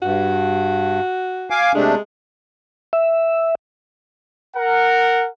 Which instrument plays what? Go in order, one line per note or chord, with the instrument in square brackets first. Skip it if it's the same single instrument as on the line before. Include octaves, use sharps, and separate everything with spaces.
[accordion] G2 [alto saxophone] F#4
[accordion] F5 G#5 D6
[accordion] C3 A3 D4 [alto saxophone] G#3
[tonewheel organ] E5
[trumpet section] A#4 F#5